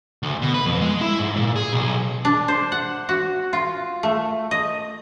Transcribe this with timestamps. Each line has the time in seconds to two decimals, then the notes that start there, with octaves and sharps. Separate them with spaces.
0.23 D2
0.42 B2
0.54 B4
0.66 F2
0.81 G#3
1.01 E4
1.19 G#2
1.36 A#2
1.56 G#4
1.73 B1
2.25 D4
2.48 C5
2.72 F#5
3.09 F#4
3.53 F4
4.03 A3
4.51 D#5